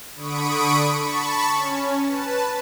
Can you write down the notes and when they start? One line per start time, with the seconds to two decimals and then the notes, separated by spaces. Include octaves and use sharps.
0.16 D3 B5 C#6 D#6 D7
1.01 A5 B5 C#6
1.55 C#4
2.06 B4 A5